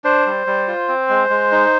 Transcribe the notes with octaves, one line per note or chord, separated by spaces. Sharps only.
D4 C5
G3
G3
F4
C4
G#3
G#3
D#4